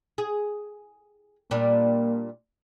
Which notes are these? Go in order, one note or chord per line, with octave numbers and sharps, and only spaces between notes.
G#4
A#2 G3 A#3 D4